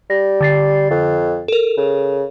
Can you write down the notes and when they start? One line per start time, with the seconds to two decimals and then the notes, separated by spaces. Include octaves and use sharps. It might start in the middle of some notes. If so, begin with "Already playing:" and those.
0.10 G3 A#6
0.41 D3 A6 C7
0.91 F2
1.48 A4 A#4
1.77 C#3